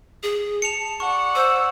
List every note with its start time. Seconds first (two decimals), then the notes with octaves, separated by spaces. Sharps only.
0.23 G#4
0.62 A5 C#7 F7
1.00 D5 F#5 C#6
1.35 C5 E6